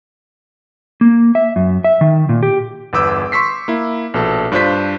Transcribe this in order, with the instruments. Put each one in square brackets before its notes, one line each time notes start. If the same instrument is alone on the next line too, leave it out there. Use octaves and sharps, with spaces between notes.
[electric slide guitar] A#3
E5
F#2
E5
D#3
A#2
G4
[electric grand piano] G1 E2 B4 D6 E6 G6
C6 C#6 E6 B6 C7
A#3 E4
A#1 B2 A4 A5
G2 D4 F4 C5 G6 B6